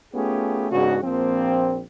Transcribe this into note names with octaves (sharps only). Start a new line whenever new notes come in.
A3 B3 C#4 F4 G4 G#4
G#2 C#3 B3 D4 F#4
A#1 F3 A#3 C4